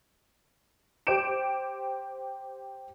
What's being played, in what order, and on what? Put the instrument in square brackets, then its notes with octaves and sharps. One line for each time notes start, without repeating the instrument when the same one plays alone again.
[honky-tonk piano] G4 C5 D6 G6 D7 E7